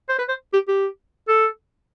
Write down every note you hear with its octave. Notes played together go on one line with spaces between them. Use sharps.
C5
B4
C5
G4
G4
A4